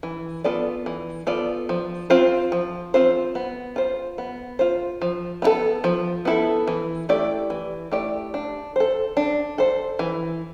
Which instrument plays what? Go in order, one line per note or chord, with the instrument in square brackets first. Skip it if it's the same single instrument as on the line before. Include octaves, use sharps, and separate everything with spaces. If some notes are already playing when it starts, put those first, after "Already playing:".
[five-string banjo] E3
B3 F4 A4 D5
E3
B3 F4 A4 D5
F3
C4 F4 C5
F3
C4 F4 C5
B3
F4 C5
B3
F4 C5
F3
B3 E4 A4
F3
B3 E4 A4
E3
A3 E4 G4 D5
E3
A3 E4 G4 D5
D4
A4 C5
D4
A4 C5
E3